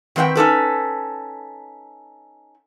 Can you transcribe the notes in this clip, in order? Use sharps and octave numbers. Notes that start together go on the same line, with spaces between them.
D#3 C4 B4 F5 G5
C#4 D#4 A4 B4